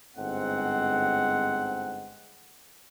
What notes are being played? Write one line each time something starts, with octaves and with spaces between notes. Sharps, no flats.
G1 G#2 C4 F#5